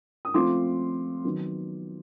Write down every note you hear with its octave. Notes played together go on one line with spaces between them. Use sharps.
D#6
F3 A3 C4 F4 C6 D6
D#3 F#3 B3